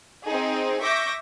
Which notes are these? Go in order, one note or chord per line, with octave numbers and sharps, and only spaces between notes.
C4 D#4 G#4
E5 C#6 D6 G6 A#6